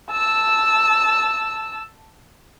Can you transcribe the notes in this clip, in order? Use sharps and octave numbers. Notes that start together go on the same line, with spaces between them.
A5 E6